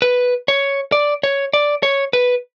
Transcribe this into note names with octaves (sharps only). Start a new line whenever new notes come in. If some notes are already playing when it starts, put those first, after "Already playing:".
B4
C#5
D5
C#5
D5
C#5
B4